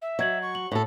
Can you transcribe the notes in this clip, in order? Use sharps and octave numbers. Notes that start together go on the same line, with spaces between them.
E5
F#3 D#5 G#6 F#7
C#6
F#7
A2 A4